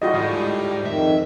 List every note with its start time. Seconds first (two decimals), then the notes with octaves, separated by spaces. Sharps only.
0.02 D2 A2 G3 F4 F#4 D#5
0.14 G#2 G#3
0.86 F2 G#2 D#3 E5